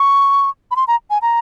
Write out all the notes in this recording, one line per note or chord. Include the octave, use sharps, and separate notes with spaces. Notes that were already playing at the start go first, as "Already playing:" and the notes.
Already playing: C#6
B5
C6
A#5
G#5
A#5